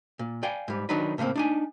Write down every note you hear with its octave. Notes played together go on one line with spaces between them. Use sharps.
A#2
D5 F5 G5 G#5
G#2 G3
D#3 F#3 D4 D#4 B4
A2 C#3 A3 A#3 C4
D4 D#4 G#5